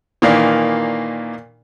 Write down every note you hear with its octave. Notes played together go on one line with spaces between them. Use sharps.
A#2 D#3 E3 A#3 D4 D5